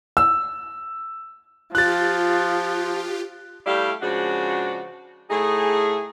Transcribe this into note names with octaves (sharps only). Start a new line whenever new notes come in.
E6
F3 F4 G4 F#6 A6
G3 A3 E4 G4 D5 F5
C#3 F3 G#3 D4 F#4
A2 A3 D#4 G#4